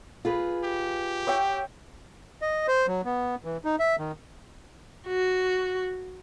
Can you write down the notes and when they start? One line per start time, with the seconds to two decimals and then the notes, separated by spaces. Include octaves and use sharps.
0.25 F4 G#4 B4
0.64 G4
1.27 C#5 E5 G5
2.42 D#5
2.68 C5
2.87 F#3
3.05 B3
3.44 E3
3.65 D#4
3.79 E5
3.99 D#3
5.08 F#4